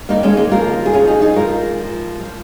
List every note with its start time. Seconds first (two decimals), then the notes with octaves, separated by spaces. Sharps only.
0.09 G#2 D#3 A#3 D#4
0.23 G#3 C#4
0.37 A#3
0.51 D#2 C#3 F3 F4 A#4
0.86 G#4
0.93 D#2 C#3 F3 C#4 F4
1.08 D#4 G#4
1.22 D#4 G#4
1.36 G#2 F3 F4 A#4
1.79 G#2 F3
2.20 F3